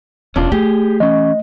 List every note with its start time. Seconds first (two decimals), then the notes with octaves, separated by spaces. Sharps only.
0.36 E1 C#4 D4 F4
0.52 A3 G4 G#4
1.00 E3 C#4 D#5